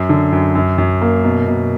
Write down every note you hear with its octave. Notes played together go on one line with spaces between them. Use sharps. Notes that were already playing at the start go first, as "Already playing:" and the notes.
Already playing: F#2
D3
F#2
F#2
F#2
A#3
B2
B2